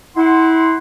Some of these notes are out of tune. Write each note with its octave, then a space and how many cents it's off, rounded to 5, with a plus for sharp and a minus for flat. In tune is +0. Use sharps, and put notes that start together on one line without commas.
E4 -25 F#5 +15 C6 -5